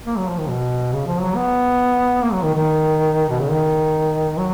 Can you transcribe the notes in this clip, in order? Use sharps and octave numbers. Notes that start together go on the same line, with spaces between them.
A#3
F#3
F3
D#3
B2
C#3
F3
F#3
B3
A#3
F#3
D#3
D#3
B2
C#3
D#3
F#3